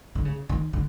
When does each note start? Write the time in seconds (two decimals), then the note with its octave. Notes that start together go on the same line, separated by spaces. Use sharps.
0.15 D3
0.25 C#3
0.49 D#3
0.73 D3